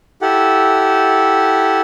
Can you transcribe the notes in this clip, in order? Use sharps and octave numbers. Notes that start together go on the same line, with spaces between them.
E4 G4 A4 F#5